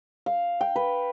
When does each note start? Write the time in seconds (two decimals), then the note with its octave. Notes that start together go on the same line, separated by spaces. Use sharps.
0.26 F5
0.61 G5
0.76 B4